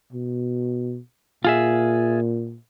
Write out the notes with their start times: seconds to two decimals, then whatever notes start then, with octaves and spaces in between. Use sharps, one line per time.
0.13 B2
1.45 A#2 F4 G#4 E5